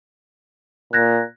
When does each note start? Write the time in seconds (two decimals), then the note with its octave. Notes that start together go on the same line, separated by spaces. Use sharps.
0.93 A#2 F#6 G#6 A#6